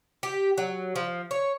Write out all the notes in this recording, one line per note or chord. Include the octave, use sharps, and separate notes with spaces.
G4
F#3
F3
C#5